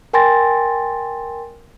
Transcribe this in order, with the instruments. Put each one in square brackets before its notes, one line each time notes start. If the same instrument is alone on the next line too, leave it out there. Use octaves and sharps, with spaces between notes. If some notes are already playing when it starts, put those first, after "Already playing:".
[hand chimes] A#4 G5 G#5 C6 A6 A#6